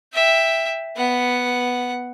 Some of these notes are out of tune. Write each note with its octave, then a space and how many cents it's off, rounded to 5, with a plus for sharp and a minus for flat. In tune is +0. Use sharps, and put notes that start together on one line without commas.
E5 +0 G5 +10
B3 +0 F#5 +0